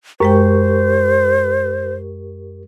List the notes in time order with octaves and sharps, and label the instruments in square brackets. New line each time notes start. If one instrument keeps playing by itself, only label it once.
[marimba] F#2 G#3 G5 [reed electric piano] G4 A#4 C#6 [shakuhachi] C5